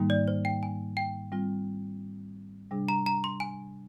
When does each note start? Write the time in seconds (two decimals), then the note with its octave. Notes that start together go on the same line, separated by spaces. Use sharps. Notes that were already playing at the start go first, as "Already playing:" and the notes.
Already playing: G#2 D#3 G3 A#3 D#4
0.10 D5
0.28 C5
0.45 G5
0.63 G#5
0.97 G5
1.32 G3 C4 F4
2.71 C3 G3 D4 G#4
2.88 A#5
3.06 A#5
3.24 C6
3.40 G#5